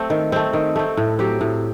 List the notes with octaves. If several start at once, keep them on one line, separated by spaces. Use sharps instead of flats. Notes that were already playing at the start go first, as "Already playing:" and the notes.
Already playing: A3 C4
D#3
A3 C4
D#3
A3 C4
A2
F#3 C4 G4
A2